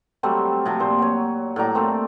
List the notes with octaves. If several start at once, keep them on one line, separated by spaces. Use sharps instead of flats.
F#3 G3 A3 C4
C3 F3 F#3
A#2 C5
F#3 C#5
A2 F#3 D5 A#5
A3 A#3 C4